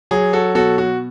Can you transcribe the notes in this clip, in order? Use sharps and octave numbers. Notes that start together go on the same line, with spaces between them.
F#3 G#4
F#4 A4
B2 F#4 A4
F#4